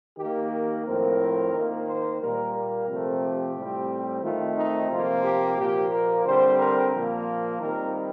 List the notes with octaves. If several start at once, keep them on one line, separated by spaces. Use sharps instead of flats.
D#3 A#3 G4
G4
A2 F3 C4 A#4
D#3 A#3
C5
A#2 G3 A#3 A#4
A#4
C3 F3 A3 C4
G4
A2 G3 C4
D#3 A3 C4 F4
D#4
C3 F3 A#3 F4
G4
A#2 F3 A#3 G4
A#4
D3 G3 C4 C5
A#4
A#2 F3 A#3
D#3 G3 C4 A#4